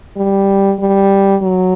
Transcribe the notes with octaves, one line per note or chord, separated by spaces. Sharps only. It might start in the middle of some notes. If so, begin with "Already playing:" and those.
G3
G3
F#3